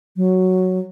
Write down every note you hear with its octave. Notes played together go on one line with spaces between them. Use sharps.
F#3